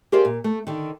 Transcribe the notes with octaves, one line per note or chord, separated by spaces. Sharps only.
G4 G#4 A#4 C5 D5 F5
A#2
A3
D3 D#3